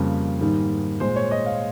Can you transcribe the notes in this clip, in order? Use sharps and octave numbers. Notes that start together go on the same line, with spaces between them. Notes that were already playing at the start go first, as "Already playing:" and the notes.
Already playing: F2 C#3 G3 A#3
G#2 D#3 G3 A#3
A#2 G#3 C5
C#5
D#5
F5